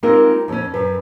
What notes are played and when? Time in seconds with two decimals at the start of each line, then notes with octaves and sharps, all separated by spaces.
0.03 G#3 C4 D#4 F4 G4 A#4
0.48 F2 C#4
0.74 F#2 B4